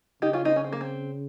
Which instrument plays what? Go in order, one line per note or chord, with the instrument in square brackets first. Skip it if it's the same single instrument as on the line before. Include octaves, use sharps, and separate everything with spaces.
[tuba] C#3 [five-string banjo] D#4 G4
[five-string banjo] C#4 F4
C4 D#4
C#4
C4
A#3
C4